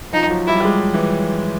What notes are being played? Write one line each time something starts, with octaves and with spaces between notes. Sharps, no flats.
F3 D#4
F3
F#3
G3 E4
G3
G#3
E3